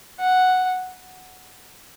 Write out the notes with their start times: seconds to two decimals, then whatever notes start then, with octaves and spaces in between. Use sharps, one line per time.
0.20 F#5